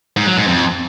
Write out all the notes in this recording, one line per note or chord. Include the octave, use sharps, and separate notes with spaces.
G#2
F#3
G#2
F2